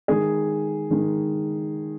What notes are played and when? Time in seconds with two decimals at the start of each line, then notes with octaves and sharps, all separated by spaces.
0.08 D#3 G#3 G#4
0.90 D#3 G#3